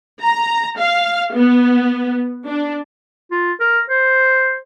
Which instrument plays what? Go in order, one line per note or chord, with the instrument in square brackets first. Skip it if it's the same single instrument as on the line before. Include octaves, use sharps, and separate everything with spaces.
[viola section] A#5
F5
B3
D4
[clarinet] F4
A#4
C5